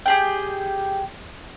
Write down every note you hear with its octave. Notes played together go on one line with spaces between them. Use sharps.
G4 G#4 G5